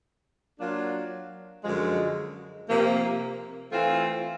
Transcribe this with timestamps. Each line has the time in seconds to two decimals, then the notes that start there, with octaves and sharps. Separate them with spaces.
0.60 F#3 A#3 D4 F4
1.64 F#2 D3 F3 G#3
2.69 C3 F3 A#3
3.71 E3 A3 C4 F4